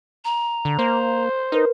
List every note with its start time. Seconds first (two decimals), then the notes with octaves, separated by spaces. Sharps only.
0.25 A#5
0.65 D3
0.79 A#3 C5
1.52 D#4 A#4 B4